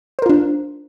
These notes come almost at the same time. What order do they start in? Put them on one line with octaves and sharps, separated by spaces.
C5 A#4 F4 D4